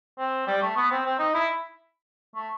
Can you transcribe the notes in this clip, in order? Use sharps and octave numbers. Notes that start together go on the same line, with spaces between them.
C4
G3
A3
B3
C4
C4
D#4
E4
A3